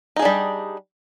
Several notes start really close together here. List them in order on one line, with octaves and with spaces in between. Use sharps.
D#4 G#4 D4 G3